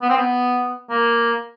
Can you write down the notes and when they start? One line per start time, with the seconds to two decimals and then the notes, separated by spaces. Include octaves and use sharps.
0.02 B3
0.10 C4
0.17 B3
0.90 A#3